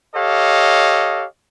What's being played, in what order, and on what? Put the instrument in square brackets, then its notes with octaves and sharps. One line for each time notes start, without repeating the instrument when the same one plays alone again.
[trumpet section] G4 A4 C#5 D#5 F5